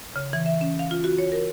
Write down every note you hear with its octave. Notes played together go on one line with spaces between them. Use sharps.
C#3
E3
E5
C#4
F5
F4
F#4
C#5
A#4